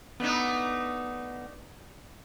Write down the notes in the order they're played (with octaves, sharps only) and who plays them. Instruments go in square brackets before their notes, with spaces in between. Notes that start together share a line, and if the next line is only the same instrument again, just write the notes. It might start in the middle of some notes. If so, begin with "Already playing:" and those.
[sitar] A3 D4 D#4 [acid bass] B3